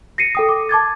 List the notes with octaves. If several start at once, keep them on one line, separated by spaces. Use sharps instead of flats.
A#6 C7 C#7 D#7
A4 G5 D#6
D6
A5 D6 G#6 A6